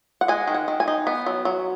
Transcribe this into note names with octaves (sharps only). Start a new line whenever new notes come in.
F#5
G#3 G#5
D#3
F#5
D#3
G#5
D#4
B3
F#3
F#3